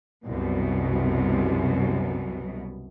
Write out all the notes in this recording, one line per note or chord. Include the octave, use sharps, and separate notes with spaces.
C2 F#2 B2